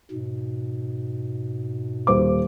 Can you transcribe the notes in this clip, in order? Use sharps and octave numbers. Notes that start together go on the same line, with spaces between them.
G#2 B2
D#1 C5 D6